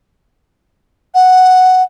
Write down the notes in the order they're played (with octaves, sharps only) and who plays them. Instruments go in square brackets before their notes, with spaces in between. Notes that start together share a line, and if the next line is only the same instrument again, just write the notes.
[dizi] F#5